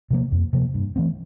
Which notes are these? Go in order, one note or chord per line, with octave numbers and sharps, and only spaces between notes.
C3 F3 A#3
F2
C3 F3 A#3
G2
E3 A3 C4